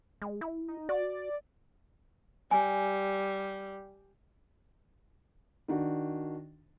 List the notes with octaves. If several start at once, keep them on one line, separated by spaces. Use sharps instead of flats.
G#3
E4
D#4
F#4 D5
G3 G#5
D#3 D4 F#4